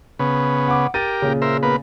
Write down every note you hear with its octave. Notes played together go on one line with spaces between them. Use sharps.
C#3 B3
F#5 D6
G4 A#4 A6 D#7
A#2 C#3
A#4 C5 E5
A#3 B3 B4